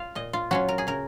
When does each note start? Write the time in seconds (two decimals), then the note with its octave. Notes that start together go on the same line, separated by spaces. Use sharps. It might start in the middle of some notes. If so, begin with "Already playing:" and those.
Already playing: F4 F5
0.15 A#2 D#5
0.33 F4
0.51 F#3 C#4 F4 F#4
0.69 A#4
0.78 G#4
0.87 C#3 A#4